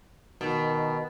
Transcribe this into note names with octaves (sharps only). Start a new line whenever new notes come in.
B2 D#3